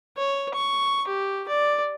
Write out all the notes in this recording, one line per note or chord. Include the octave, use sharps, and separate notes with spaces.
C#5
C#6
G4
D5